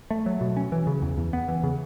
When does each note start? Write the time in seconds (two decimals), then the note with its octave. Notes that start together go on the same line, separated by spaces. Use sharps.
0.10 A3
0.26 F#3
0.41 B2
0.57 C#4
0.72 E3
0.87 C#3
1.02 E2
1.17 E2
1.33 B3
1.48 E3
1.64 C#3